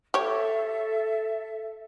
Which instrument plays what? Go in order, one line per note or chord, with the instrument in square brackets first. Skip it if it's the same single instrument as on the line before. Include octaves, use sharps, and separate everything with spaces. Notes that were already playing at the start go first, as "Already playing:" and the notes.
[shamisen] G4 C#5 [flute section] A4 E5